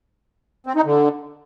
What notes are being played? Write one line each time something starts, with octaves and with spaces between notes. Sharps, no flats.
C4
D#4
D3